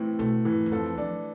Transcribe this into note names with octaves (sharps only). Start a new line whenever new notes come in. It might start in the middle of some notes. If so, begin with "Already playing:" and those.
Already playing: A2 E3 A3 C4
B2 A3
G#2 E3
E2
F2 A4
E2
F2 D4